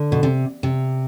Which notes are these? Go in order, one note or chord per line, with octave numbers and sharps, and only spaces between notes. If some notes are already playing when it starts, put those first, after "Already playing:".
Already playing: D3
B2
C3
C3